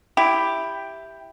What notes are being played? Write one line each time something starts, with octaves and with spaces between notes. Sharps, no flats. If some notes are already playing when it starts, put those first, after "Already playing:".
E4 G4